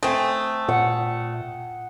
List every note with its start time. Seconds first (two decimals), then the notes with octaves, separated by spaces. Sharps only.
0.03 A3 C4 G5 G#5 D#6
0.69 A#2 F#5